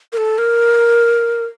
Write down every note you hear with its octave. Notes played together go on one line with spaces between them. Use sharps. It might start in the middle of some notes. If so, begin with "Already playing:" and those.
A#4
A4
A#4